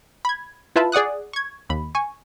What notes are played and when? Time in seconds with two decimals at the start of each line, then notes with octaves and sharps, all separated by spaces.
0.25 B5 G#6
0.76 E4 F4 B4 E5 A5 B5
0.92 G#4 D5 F#5 D#6 F#6
1.33 C#6 G#6
1.69 D#2 B5
1.95 G#5 C#6